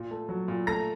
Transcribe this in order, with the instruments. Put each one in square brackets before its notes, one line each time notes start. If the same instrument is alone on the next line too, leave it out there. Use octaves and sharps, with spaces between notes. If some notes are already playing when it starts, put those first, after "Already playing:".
Already playing: [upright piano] A#2
A3
F#3
A#2
A3 A#5 A#6